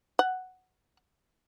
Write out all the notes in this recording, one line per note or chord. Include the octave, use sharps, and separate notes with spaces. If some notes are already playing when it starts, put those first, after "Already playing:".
F#5